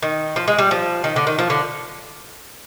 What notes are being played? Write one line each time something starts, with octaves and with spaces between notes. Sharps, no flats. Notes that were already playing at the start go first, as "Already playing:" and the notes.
D#3
F3
G#3
G3
F3
D#3
D3
D#3
F3
D3